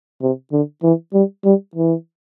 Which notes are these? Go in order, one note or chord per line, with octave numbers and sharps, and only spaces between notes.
C3
D3
E3
G3
G3
E3